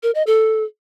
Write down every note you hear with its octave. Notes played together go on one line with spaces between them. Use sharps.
A#4
D#5
A4